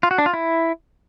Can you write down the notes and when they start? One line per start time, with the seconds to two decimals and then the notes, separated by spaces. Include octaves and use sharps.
0.03 F4
0.11 F#4
0.18 D4
0.26 F4
0.34 E4